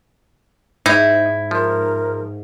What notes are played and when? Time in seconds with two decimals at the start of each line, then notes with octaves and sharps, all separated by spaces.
0.86 G#2 D#4 E4
1.51 F3 A#4